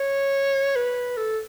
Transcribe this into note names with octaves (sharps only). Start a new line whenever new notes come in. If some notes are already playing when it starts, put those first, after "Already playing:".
Already playing: C#5
B4
A4